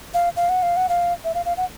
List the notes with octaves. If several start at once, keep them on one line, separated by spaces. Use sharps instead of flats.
F5
F5
F#5
F5
F#5
F5
E5
F5
F5
F#5